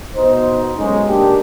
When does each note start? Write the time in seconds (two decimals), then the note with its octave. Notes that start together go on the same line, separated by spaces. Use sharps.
0.15 B2 D#4 C5
0.77 B1 G#3 C#4 D#4
1.07 A#3 D4 G4